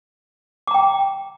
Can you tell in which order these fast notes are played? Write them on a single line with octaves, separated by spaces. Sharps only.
D6 A#5 G5